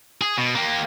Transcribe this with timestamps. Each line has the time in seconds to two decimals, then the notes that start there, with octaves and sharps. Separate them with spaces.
0.21 G#4
0.38 B2
0.55 A#3 G4